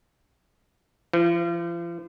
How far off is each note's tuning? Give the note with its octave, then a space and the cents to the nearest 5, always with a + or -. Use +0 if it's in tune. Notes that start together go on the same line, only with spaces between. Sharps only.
F3 -40